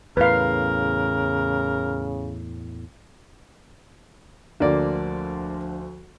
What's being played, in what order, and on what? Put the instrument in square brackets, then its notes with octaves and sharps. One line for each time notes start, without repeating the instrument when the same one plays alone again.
[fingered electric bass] E2 A2 [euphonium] C#3 [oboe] A#4 [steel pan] B4 F5
[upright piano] D2 [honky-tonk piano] D3 [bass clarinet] F3 [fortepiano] A#3 D5